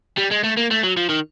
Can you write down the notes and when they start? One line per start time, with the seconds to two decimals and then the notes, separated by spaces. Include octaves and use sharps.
0.18 G3
0.32 G#3
0.44 A3
0.57 A#3
0.71 A3
0.84 F#3
0.97 F3
1.10 D#3